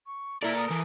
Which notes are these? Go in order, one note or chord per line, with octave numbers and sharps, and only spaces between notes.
C#6
A#3 E4 A4 A#4 D5
D#6
E3